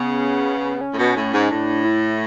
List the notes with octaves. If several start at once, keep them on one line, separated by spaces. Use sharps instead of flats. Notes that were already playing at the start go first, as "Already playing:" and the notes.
Already playing: C#3 B3
C#4
A2
B2
A2
G#2
A2 D4
E4